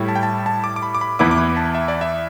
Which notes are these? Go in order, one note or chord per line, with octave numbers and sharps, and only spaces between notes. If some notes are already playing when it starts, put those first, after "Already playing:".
Already playing: A2 G3 E4
A5
G5
A5
A5
D6
D6
B5
D6
B5
E2 E3 B3 E4 D6
D6
B5
A5
E5
D5
E5